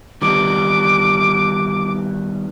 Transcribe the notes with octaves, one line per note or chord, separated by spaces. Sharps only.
D#3 G3 B3 D6